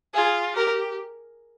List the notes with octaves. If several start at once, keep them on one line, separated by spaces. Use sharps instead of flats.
F4 G#4
G4 A#4